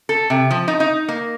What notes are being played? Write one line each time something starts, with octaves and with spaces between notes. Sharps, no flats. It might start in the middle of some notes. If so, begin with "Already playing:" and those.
A4
C3
F3
D#4
D#4
A#3